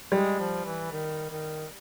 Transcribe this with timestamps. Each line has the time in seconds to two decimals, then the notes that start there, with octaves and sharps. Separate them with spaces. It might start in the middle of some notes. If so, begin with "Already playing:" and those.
0.12 G3 G#3
0.39 F3
0.65 E3
0.91 D#3
1.30 D#3